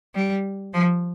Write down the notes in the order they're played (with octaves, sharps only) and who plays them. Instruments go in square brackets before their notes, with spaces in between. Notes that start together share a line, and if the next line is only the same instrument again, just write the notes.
[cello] G3
F3